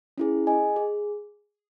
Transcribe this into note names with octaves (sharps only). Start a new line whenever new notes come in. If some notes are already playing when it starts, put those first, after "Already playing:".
C#4 E4 G#4
G#4 D#5 G#5
G#4